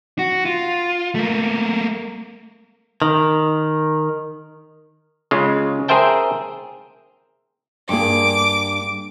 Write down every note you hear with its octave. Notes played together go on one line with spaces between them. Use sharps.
F#4
F4
A3 A#3
D#3
C#3 G#3 F4
G#4 A#4 C5 E5 G5 A5
G2 A#3 G#4 D6